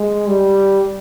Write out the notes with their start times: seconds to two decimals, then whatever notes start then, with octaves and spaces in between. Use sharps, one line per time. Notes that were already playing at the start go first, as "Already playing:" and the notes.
Already playing: G#3
0.28 G3